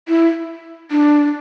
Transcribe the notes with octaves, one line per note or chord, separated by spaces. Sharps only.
E4
D4